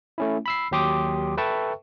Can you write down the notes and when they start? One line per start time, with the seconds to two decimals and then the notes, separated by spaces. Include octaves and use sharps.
0.18 A3 C#4 E4
0.46 B5 E6 C7
0.71 D#2 F#3 G4 C6 D6 D#6
1.37 A4 B4 E5 G5 A5 C#6